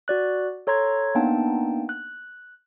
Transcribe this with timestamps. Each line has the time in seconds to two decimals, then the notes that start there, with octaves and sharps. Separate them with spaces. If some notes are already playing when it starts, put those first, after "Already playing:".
0.08 F#4 D5 F#6
0.67 A4 C#5 A#5 C6 G#6
1.15 A#3 B3 D4 D#4 G5 A5
1.89 F#6